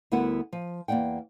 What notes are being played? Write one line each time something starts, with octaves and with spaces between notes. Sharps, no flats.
D2 G3 B3 E4 A#4 F#5
F3
E2 A#3 D5 F#5 G5